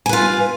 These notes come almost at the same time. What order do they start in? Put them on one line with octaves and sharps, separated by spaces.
G#5 B4 F4